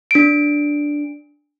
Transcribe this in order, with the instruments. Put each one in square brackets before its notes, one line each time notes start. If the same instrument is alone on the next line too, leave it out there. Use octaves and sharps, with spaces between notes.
[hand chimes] D4 D7